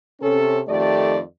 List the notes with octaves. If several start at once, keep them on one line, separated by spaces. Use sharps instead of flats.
C3 C#4 A4
F2 D#3 A3 G4 D5